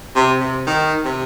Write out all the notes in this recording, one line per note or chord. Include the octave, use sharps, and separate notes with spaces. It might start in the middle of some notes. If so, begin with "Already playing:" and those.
C3
C3
D#3
C3